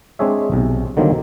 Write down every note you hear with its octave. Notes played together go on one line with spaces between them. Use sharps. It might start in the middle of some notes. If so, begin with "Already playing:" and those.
G#3 C4 D4 G#4 C#5 E5
B1 C3
D3 D#3 F#3 G3 A#3 C4